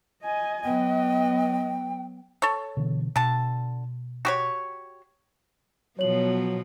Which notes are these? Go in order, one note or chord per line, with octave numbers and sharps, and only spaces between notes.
D#5 G#5
F#3 B3 D#5 G5
A4 C#5
B2 D3 E3
B2 D3 A5
F#4 G4 C#5
B2 F3 F#3 B3 C#5 F#7